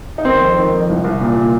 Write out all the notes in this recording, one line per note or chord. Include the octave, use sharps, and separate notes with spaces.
D#4
D#3 C4
F2
D#3
F2
C2
C2
A#2
A#2